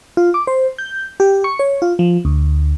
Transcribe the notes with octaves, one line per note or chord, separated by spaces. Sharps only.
F4
D6
C5
G6
G4
C#6
C#5
F4
F3
D2